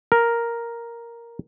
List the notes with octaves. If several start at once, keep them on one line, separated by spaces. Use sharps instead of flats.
A#4